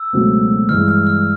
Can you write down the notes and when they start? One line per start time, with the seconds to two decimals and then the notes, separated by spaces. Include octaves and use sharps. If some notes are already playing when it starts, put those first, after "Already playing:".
Already playing: E6
0.13 C#2 B2 F#3 A3 C4
0.69 G2 E3 G#3 F6
0.88 F6
1.07 F6